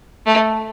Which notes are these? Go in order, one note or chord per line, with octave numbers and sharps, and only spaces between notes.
A3